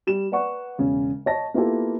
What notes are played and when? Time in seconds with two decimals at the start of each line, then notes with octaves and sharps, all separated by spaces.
0.07 G3 E7
0.32 B4 D5 F#5 C#6
0.78 E1 C#3 C#4
1.26 C#5 D#5 A5 A#6
1.54 A#3 B3 E4 F4 G4 A4